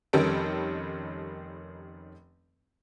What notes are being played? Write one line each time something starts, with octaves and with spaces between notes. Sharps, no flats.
F1 D#3 G3 C#4 A4 D7